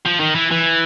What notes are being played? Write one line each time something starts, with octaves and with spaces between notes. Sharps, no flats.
F3
D#3
E3
E3